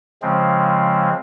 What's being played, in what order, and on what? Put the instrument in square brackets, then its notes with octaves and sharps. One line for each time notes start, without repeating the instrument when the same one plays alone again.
[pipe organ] C#3 F3 G#3 C4